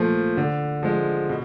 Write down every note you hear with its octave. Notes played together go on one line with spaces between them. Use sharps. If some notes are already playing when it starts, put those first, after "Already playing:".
Already playing: A#2 F3 A3
D3
F3 G#3
B2